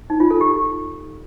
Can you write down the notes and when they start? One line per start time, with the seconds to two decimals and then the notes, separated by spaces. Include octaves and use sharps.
0.10 D#4
0.20 F4
0.30 A4
0.41 G4